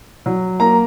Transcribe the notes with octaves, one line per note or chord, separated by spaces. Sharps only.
F#3
A#3 A#5